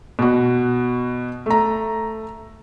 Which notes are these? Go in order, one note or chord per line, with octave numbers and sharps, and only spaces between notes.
B2 F#4
A3 A#5